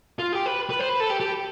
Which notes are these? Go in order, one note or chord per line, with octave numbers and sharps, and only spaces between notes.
F4
G4
B4
B4
C5
B4
A4
G4
G4